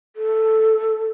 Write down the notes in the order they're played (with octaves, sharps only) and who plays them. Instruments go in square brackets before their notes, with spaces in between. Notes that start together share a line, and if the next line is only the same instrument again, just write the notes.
[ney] A4